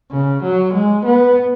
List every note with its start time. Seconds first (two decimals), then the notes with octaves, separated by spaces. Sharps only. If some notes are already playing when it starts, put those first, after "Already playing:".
0.12 C#3
0.43 F#3
0.74 G#3
1.05 B3